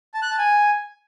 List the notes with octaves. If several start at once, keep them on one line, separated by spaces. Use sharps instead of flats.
A5
F#6
A5
G#5